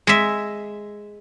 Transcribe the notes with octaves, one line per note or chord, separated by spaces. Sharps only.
G#3 E5